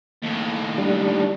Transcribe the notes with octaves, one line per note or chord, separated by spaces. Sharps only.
D#2 A2
G3 D4